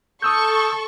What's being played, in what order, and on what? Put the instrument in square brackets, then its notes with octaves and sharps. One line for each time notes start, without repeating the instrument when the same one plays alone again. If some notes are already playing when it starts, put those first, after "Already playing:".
[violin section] A4 C#6 [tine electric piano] D#6 E6 G6